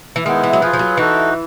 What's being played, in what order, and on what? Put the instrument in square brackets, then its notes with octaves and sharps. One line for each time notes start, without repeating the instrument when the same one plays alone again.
[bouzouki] E3
[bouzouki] D#3 [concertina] G#3 B3 E4
[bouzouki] E3
F#3
[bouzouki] F3 [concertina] F4 G#4 B4
[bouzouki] F3
F#3
[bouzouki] E3 [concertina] D#4 F#4 A4